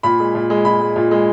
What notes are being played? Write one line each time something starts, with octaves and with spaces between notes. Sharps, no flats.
A#2 B5
G#3
A#2
G#3
A#2 B5
G#3
A#2
G#3